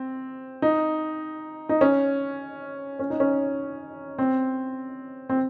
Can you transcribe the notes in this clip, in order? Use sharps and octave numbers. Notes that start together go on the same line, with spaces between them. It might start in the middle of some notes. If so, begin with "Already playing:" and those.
Already playing: C4
D#4
D#4
C#4
C#4
D#4
C#4
C4
C4